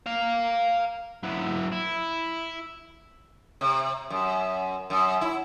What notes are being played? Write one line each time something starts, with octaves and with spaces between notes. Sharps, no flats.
F5 A#5
F#3 E4
E4
C3
F#2
F#2
E4